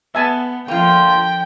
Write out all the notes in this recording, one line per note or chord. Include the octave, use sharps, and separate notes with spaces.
B3 E5 G#5 A5
D3 F3 A#3 F4 G5